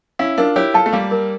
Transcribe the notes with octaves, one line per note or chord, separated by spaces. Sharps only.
C#4 E4 F5
D4 F4 A#4
E4 G4 C#5
F4 A4 A5
A3
G3 A#3 F5
A#4